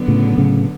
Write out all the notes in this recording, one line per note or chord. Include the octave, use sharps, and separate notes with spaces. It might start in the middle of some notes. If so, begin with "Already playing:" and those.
Already playing: D3 F#3 B3
A2 C#3
A2 C#3